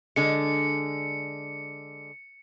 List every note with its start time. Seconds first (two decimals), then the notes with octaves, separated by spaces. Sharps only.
0.16 D3 G#3 C#7